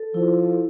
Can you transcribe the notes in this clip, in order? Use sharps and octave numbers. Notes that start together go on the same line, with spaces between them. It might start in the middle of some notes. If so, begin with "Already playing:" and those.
Already playing: A4
F3 E4